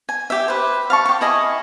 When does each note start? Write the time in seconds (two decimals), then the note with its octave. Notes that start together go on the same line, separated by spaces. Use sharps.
0.09 G#5
0.30 G4 E5
0.48 B4 C5
0.90 F5 A5 C#6
1.05 G4 C#6
1.21 E4 G#4 D#5 G#5